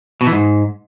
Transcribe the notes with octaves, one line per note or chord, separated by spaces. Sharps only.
B2
E3
G#2